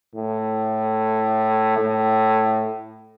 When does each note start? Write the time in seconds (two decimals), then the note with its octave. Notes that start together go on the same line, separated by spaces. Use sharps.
0.15 A2
1.78 A2